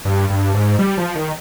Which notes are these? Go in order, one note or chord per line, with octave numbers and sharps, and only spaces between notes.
G2
G2
G#2
G3
F3
D#3